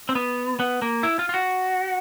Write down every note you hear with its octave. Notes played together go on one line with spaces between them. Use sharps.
C4
B3
B3
A#3
E4
F4
F4
F#4